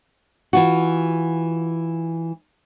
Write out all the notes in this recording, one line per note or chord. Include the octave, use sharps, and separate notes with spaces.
E3 F4 F#4